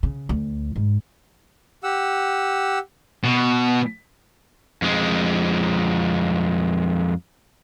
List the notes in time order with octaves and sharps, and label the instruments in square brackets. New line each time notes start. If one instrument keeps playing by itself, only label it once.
[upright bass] C#3
D2
G#2
[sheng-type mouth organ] G4 F#5 E6
[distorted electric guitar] B2
[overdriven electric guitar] F2 G#3